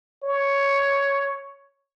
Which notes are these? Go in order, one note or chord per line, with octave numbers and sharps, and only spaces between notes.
C#5